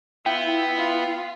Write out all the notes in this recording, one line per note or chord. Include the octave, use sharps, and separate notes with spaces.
B3 E4 F4 E5 G5
F4